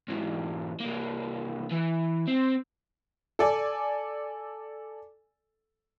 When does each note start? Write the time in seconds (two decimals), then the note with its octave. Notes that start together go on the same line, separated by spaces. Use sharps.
0.08 G#2 E3
0.80 C2 A#3
1.71 E3
2.27 C4
3.39 A4 D5 G#5